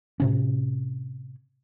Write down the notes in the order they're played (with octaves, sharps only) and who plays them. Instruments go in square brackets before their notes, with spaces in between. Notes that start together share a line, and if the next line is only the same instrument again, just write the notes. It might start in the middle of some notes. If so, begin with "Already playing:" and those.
[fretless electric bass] A2 C3 C#4